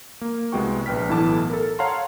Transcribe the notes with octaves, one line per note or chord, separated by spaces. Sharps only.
A#3
C2 G#3 B3 F#4 G5 C#6
A#1 B4 G5 F6 B6
B1 A2 E3 B3 A5 D6
A4 A#4
C#5 F5 F#5 A5 A#5 C6